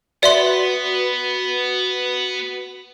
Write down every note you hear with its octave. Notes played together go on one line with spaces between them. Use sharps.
B3 F#4 B4 D5 E5 C6